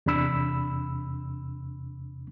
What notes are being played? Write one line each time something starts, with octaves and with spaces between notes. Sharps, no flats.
E2 C3 D4 B5 E6